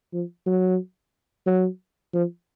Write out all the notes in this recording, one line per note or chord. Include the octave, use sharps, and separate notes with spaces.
F3
F#3
F#3
F3